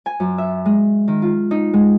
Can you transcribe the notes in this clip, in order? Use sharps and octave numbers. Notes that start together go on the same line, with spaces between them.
G#5
F#2
E5
G#3
D#3
F4
D#4
G#3